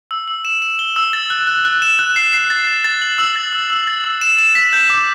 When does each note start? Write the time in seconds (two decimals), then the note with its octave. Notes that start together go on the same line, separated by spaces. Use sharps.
0.11 E6
0.28 E6
0.45 E7
0.62 E7
0.79 G7
0.96 E6
1.13 A6
1.30 F#6
1.47 F#6
1.65 F#6
1.82 E7
1.99 F#6
2.16 C7
2.33 C7
2.50 A6
2.67 A6
2.84 A6
3.02 F#7
3.18 E6
3.36 A6
3.53 E6
3.70 E6
3.87 A6
4.04 E6
4.21 E7
4.39 E7
4.55 B6
4.73 G6
4.90 D6